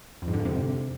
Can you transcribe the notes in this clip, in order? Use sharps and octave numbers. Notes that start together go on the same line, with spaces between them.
F2
G#2
D3
F2
C3